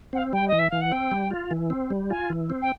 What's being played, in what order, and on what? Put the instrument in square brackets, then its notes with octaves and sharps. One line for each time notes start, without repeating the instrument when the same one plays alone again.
[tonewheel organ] C4 [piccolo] F#5
[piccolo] F5
[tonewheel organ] G3 [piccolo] G5
[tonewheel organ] E3 [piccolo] D#5
[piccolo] E5
[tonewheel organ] E3 [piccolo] F5
[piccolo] F#5
[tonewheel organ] C4 [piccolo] G5
[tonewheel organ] G3
F4
E3
C4
G3
[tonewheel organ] F4 [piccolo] G#5
[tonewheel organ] E3
C4
[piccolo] G5